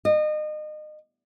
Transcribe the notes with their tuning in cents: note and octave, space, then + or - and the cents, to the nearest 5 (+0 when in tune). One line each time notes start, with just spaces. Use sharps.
D#5 -30